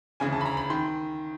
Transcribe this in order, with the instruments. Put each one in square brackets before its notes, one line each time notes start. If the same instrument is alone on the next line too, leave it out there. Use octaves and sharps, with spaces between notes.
[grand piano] D2 C#3 E3 G#5
A5
B5
A#5
B5
D#3 C6